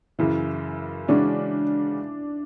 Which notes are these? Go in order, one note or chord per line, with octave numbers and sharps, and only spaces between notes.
F#2 C#3 E3 E4
C#3 E3 G#3 C#4 D4 F#4